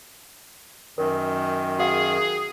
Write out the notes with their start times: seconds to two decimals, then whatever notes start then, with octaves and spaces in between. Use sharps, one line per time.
0.98 F#2 D#3 A#4
1.79 F#4 G#4 F5 F#5